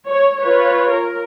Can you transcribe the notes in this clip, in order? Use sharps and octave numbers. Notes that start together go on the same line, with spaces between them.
C#5
F4 B4 C#5
A#4